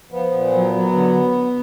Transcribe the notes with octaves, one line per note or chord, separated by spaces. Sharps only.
F3 B3
A#2
F#3
F#3
D3